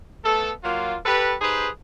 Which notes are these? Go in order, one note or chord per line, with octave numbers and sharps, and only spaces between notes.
A3 B3 A4
F#3 A#3 F4
G4 A4 B4
D#4 G4 G#4 B4 C5